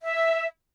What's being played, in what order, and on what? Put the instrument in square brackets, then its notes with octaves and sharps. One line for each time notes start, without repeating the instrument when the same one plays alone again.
[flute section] E5